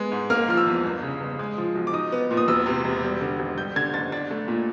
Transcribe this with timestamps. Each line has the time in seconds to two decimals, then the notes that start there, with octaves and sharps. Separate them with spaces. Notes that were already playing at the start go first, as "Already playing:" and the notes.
Already playing: G#3 B3
0.12 G#2
0.30 A#3 F6
0.48 F3 F6
0.57 E6
0.67 E2
0.84 G1
1.03 C#3
1.21 G1
1.39 G#3 D#6
1.58 F3
1.75 B1
1.87 D6
1.93 D#4 D#6
2.12 B3
2.31 A#2
2.37 D#6
2.48 E1 E6
2.66 C3
2.84 E1
3.03 G3
3.21 D3
3.39 G#1
3.57 G3 G6
3.76 D3 G#6
3.93 F#1 A6
4.12 D4 A6
4.31 A3
4.48 A#2